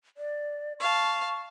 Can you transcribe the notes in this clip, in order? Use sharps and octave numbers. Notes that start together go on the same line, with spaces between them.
D5
F5 A5 C#6